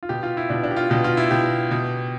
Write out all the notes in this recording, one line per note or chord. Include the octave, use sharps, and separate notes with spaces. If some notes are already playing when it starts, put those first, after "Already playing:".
F4
B2 G4
F4
E4
B2 D4
D4
G4
F4
B2 G4
F4
E4
B2 G4
B2